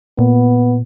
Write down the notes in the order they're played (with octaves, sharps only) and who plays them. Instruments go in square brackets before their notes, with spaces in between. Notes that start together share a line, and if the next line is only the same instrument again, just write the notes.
[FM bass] A#2 [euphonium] B3